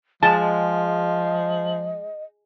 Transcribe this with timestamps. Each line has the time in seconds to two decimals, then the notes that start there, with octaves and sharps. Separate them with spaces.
0.23 F3 G#3 D#5 A5